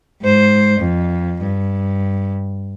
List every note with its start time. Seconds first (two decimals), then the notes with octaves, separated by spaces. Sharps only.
0.22 G#2 C5
0.80 F2
1.42 G2